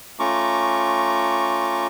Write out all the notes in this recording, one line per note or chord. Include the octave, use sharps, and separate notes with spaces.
A3 C#4 F4 A#5 C#6 D6